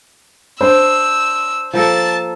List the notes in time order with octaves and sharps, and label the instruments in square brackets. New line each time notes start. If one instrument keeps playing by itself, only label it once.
[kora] D4 [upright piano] C5 [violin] E6
[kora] F3 A#3 A4 [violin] A5 A6